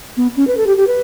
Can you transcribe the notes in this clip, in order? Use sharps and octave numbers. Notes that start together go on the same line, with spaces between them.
B3
C#4
B4
A4
G4
G4
B4